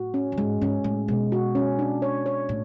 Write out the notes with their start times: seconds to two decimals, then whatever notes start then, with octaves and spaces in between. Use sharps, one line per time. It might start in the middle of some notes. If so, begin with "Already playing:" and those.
Already playing: A2 F#4
0.14 C#4
0.32 F#2
0.37 G#2 G#3
0.61 G#2 C#4
0.84 A2 G#3
1.08 B2 G#3
1.32 F#4
1.55 C#4
1.79 D4
2.02 C#5
2.26 C#5
2.49 A2